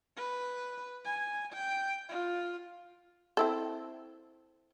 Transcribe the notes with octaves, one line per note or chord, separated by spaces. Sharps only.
B4
G#5
G5
F4
C4 E4 A4